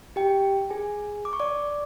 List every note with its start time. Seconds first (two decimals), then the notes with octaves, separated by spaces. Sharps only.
0.16 G4 G5
0.70 G#4 G#5
1.25 D6
1.33 C#6
1.40 D5 D6